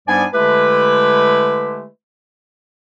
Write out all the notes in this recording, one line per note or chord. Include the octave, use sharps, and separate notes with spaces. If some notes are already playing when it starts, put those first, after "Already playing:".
G#2 G3 B3 D4 D5 G#5
D3 G#3 A3 E4 G4 B4